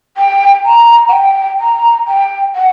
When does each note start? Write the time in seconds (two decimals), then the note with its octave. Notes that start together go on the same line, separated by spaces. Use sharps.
0.17 G5
0.65 A#5
1.09 F#5
1.13 G5
1.60 A#5
2.08 G5
2.56 F#5